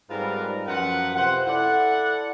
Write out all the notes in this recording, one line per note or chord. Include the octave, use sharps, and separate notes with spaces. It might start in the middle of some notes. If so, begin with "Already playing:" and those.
G#2 G3 C4 F4 A#4 B4
F#2 F3 F4 B4 F#5
C3 C4 C5 F#5
E4 A4 D5 F#5